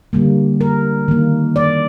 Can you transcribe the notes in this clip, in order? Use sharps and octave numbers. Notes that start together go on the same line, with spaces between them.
D3 G3 A#3
A#4
D#3 A#3
D5